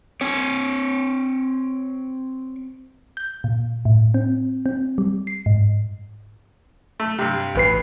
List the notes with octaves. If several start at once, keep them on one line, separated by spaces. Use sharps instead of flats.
C4 C#5
G6
A#2
A2
C4
C4
G3
C7
G#2
A3
G2 C3
A1 D2 B4 C7